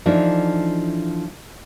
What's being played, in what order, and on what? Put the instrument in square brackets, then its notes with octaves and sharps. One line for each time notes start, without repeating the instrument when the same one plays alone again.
[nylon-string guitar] E3 F3 A3 D4 D#4